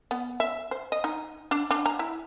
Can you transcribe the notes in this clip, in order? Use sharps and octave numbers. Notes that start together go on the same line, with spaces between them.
B3
E5
C5
D#5
D#4
D4
D4
A#5
E4